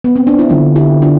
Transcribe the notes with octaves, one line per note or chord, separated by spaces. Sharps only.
B3
C4
D4
E4
D3 D4 F4
E4 G4
D4 F4